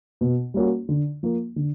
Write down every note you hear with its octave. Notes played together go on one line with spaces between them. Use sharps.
B2
G3 A#3 C#4 F#4
D3
F3 A#3
D3